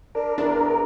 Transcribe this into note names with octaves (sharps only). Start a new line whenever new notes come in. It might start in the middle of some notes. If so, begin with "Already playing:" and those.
D4 A#4
E2 D4